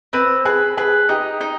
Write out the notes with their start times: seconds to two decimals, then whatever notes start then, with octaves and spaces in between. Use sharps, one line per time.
0.13 C4 B4
0.45 G#4 B4
0.77 G#4 B4
1.09 D#4 G4
1.41 D#4